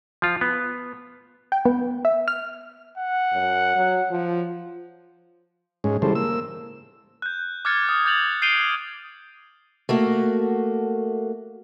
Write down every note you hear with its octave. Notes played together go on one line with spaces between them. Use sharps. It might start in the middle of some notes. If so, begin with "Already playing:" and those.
F3 F4
B3
G5
B3
E5
F6
F#5
F#2
F#3
F3
G#2 G#3 C#4
C#3 E3 G3 G#3 A4 C5
A#3 E6
F#6 G6
D6 F6 F#6 G#6 A6 C#7
D#6 F6
D6 G6 A6 F7 F#7
G6 C7 D7 D#7 F7 G7
A3 A#3 F#4